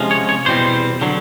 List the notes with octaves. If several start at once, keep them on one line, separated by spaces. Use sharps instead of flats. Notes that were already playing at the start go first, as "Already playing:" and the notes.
Already playing: C3 F3 G#3 C#4
C#5
C#5
E2 B2 G3 C4 C5
D3 F#3